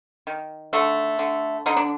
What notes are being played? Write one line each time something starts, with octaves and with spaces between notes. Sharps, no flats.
D#3
D3 A3 A4
D3
D3 D#4
D4